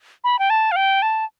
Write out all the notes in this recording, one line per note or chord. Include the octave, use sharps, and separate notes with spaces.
B5
G5
A5
F5
G5
A5